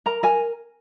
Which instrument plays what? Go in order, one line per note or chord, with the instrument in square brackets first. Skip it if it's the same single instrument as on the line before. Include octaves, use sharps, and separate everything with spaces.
[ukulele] A#4 A#5
A#4 G#5